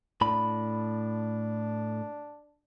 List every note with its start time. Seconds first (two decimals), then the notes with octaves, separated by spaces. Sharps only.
0.21 A2 D4 B5